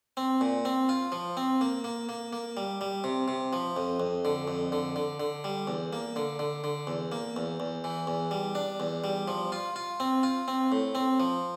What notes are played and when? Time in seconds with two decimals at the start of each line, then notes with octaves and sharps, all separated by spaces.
0.17 C4
0.41 A#2
0.65 C4
0.89 F4
1.12 F3
1.37 C4
1.61 A#3
1.84 A#3
2.09 A#3
2.33 A#3
2.57 G3
2.81 G3
3.04 C3
3.28 C3
3.53 F3
3.77 F2
4.00 F2
4.25 D3
4.48 F2
4.72 D3
4.96 D3
5.20 D3
5.44 G3
5.67 E2
5.93 A#3
6.16 D3
6.39 D3
6.64 D3
6.87 E2
7.12 A#3
7.36 E2
7.60 E2
7.84 E3
8.07 E2
8.31 G3
8.55 D4
8.80 E2
9.04 G3
9.28 F3
9.52 F4
9.76 F4
10.00 C4
10.23 F4
10.48 C4
10.72 A2
10.95 C4
11.20 F3